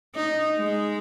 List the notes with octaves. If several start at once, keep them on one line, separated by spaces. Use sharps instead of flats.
D#4
G#3